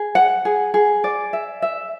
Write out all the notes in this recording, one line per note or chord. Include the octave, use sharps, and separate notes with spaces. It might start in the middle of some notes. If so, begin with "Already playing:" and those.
Already playing: G#4
F#5
G#4
G#4
D5
E5
E5